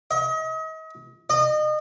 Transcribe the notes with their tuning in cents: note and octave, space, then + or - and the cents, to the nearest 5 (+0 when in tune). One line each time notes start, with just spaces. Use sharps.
D#5 +40
D#5 -30